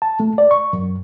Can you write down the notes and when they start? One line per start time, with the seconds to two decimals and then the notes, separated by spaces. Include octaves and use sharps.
0.02 A5
0.20 A3
0.38 D5
0.51 C#6
0.73 F#2